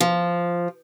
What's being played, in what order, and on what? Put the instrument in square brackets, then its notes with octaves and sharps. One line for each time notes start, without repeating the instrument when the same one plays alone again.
[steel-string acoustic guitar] F3